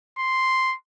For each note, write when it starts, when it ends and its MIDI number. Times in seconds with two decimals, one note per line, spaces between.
0.19 0.76 84